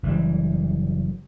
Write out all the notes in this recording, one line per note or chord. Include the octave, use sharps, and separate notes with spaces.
F#1 E3 G3